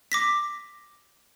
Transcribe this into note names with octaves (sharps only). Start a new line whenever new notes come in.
D6 A#6 B6